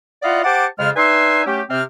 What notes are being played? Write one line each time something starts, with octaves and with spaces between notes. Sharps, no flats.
E4 F4 D5 D#5 F5 F#5
G4 C5 F#5 A5 D6
F2 C#3 G#3 F4 F6
D4 D#4 B4 E5 G#5 C6
F#3 A3 C#4 G4
C3 C4 F6